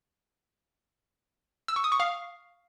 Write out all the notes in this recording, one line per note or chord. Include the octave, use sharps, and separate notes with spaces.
E6
C#6
D#6
C#6
F5